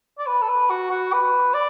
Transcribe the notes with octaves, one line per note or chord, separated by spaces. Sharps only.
D5
B4
A4
B4
F#4
F#4
B4
D5